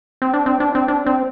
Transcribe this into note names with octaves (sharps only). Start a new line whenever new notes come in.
C4
D4
C4
D4
C4
D4
C4